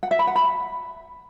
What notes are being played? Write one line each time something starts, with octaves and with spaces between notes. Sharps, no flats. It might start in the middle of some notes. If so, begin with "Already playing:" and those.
F#5
E5
B5
F#5
B5